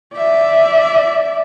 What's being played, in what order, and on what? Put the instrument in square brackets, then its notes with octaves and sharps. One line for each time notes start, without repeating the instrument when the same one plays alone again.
[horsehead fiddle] D5 E5